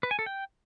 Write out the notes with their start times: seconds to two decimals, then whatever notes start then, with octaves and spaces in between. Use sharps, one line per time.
0.03 B4
0.11 G#5
0.19 A4
0.26 G5